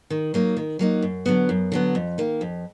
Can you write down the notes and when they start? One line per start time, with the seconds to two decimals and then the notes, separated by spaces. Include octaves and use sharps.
0.10 D#3
0.34 F#3 A#3 D#4
0.57 D#3
0.79 F#3 A#3 D#4
1.02 F#2
1.26 D3 F#3 B3
1.49 F#2
1.72 D3 F#3 B3
1.95 F2
2.18 D#3 A#3
2.41 F2